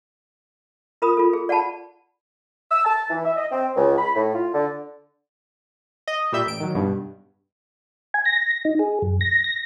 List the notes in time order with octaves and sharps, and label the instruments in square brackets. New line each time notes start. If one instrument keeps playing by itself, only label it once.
[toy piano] F4 A#4 B5 D#6
F4 A4
G#4
D5 F#5 G5 A5 B5
[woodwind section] E6
A5
E3
E5
D#5
C4
C#2
B5
A2
F4
D3
[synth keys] D#5
A#2 G3 E5 G6
A1 D7
D#3 F#3
G2 B2
[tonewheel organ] G#5
A#6
D#4
G#4
F#2
A#6
A#6